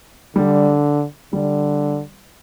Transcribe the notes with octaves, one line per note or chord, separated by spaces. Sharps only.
D3 G3
D3 G3